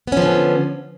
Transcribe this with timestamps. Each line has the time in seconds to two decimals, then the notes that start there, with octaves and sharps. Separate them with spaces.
0.07 B3
0.12 C#4
0.17 F3
0.22 D3